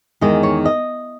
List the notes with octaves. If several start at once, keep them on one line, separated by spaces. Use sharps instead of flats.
E2 D#3 G#3 D#5
C#5
D#5